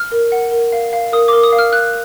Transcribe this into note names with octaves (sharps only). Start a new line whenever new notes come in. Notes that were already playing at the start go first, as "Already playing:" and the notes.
Already playing: F6
A#4
F#5
A#4
F5
F5
A#4 D#6
A#4 D6
D#6
F5
F6
F5 F#6